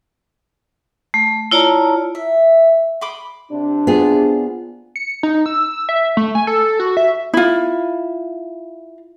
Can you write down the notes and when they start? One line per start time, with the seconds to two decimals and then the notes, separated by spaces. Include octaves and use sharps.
1.14 A3
1.51 E4 F4 C#5 D5 A5 A#5
2.15 E5
3.01 B5 C6 D6 D#6
3.52 C3 D4
3.87 B3 F4 G#4
4.96 C#7
5.23 D#4
5.46 E6
5.89 E5
6.17 A3
6.35 G#5
6.47 A4
6.80 F#4
6.97 E5
7.34 E4 F4